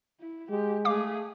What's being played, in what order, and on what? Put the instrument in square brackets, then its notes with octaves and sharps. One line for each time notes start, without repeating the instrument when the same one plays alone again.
[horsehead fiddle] E4
[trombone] G#3 [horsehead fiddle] G4
[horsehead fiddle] A3 G#4 [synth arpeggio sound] F5 D6